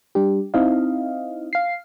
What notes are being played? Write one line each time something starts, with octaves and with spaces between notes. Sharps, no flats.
G3 D4 G4
C4 D#4 E4 D#5 F5
F5 C7